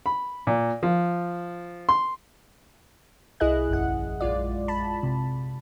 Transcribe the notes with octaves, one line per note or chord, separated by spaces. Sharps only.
B5
A#2
F3
C6
C2 E4 G#4 D#5 F#6
A1 F#2 F#5
A#1 G#3 F4 D5
A5 B5
C3